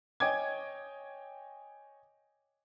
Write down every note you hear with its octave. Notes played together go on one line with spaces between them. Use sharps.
C#5 D#5 G5 G#5 D6 G#6